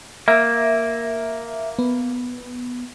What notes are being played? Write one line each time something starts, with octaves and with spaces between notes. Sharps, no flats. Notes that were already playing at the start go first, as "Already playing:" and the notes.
A#3 E5
B3